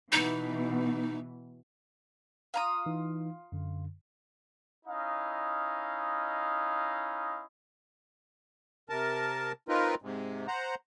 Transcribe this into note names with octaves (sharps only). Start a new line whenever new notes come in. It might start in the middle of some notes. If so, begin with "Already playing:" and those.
B2 E3 D#4
F4 A#5 D#6
E3 D#4
F#2 D3
C#4 D#4 E4 D#5 F5
C3 A#4 A5
C4 D#4 F4 A#4 B4
G#2 C3
C5 F#5 A#5